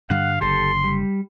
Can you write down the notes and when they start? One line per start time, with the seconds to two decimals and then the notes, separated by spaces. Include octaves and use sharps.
0.10 G2 D3 G3 F5 F#5
0.41 F#1 D3 G4 A4 C6
0.84 G3